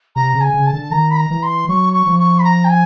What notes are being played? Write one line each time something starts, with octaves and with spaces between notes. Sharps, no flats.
C3 A#5
C#3
G#5
C#3
A5
D3
D#3 A#5
B5
A#5
E3
C6
F#3 C#6
C#6
F3
C#6
B5
A#5
G5
G#5